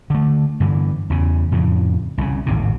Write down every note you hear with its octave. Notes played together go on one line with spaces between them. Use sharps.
D3 A3
G2 D3 E3
E2 C#3
F2 A2 C#3
C2 C#3
A1 D#2 G#2 C3